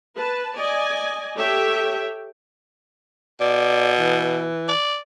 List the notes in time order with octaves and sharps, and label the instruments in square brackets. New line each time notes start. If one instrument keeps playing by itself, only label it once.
[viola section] B4 A5
D5 D#5 G#5
G4 A4 C#5 E5 G5
[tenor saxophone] B2 [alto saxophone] D5
[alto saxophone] E3
[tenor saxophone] D5